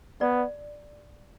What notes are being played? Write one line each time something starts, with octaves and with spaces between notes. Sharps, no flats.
B3 D5